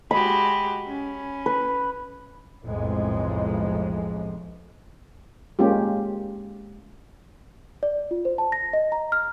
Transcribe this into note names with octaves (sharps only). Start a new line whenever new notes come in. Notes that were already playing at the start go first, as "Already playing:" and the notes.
G#3 F#4 G4 B5
C#4
B4
B1 F2 A2 C3 G#3
G#3 A#3 C#4 F4 G4
D5
F4
C5
A5
A#6
D#5
A#5
F6